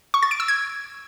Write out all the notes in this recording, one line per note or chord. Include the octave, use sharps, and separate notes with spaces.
C#6
A6
D7
E6
G#6